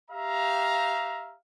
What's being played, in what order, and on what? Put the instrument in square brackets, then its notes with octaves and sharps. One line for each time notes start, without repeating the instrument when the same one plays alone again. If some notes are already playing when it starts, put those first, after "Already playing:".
[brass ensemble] G4 E5 F5 A#5